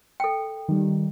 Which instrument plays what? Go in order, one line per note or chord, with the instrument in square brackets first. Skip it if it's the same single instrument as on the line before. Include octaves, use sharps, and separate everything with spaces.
[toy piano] A4 G5
[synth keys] D#3 G3